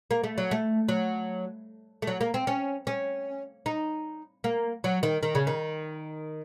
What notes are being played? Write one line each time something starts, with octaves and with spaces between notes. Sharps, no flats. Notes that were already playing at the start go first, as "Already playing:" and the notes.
A#3
A3
F#3
A3
F#3
A3
F#3
A#3
C4
C#4
C#4
D#4
A#3
F#3
D#3
D#3
C#3
D#3